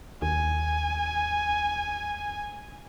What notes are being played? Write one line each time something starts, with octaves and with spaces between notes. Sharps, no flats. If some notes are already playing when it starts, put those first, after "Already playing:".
D#2 G#5